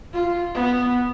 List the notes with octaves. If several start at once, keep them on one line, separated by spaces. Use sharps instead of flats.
F4
B3